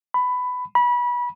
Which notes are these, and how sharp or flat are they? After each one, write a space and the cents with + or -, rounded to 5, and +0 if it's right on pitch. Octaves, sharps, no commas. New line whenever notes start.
B5 +15
B5 -25